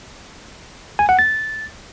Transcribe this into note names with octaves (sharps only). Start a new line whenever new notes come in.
G#5
F#5
A6